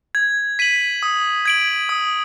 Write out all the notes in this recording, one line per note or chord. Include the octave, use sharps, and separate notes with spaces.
G#6
B6 D#7 F#7
D#6
G#6 D7 F#7
D#6